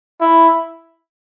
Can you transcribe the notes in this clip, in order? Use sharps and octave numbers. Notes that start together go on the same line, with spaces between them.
E4